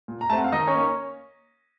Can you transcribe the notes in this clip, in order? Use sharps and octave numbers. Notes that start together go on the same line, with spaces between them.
A#2
A#5
A3 C4 F#5 A5
F5
D#3 D#4 D#5
C#4 C#5
A#3